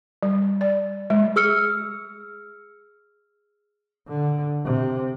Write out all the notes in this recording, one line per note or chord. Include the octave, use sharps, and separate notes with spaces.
G3
D5
G#3
G#4 E6 F6 C#7
D3
C3